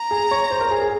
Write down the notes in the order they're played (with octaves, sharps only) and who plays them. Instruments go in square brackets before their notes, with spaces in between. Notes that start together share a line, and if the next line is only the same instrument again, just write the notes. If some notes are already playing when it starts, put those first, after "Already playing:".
Already playing: [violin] A#5
[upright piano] G#4
C#5
C5
A#4
G#4
G#4